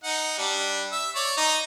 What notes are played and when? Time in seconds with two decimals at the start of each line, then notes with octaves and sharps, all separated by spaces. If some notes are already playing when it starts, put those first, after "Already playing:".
0.04 D#4 F#5
0.39 G3 D4
0.92 E5
1.16 C#5 D5 D6
1.37 D#4 A#5